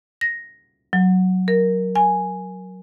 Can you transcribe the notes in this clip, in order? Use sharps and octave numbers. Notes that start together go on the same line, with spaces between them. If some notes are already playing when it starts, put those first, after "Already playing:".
A#6
F#3
A#4
G#5